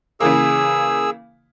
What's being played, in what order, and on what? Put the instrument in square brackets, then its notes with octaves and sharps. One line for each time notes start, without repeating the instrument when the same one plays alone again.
[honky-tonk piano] C#3 E3 A#3 [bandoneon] G#4 E6